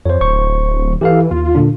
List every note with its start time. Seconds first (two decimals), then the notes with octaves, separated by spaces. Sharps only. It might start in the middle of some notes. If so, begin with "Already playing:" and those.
0.05 F2 C5 C#5
0.21 D1 C5 C#6
1.01 E3 G4 A4 F5
1.31 D#2 F4
1.55 A#2 D3 D4